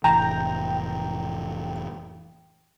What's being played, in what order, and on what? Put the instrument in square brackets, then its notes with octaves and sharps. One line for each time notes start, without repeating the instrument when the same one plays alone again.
[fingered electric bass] F1 A2 E3 [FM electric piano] G5 [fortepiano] A#5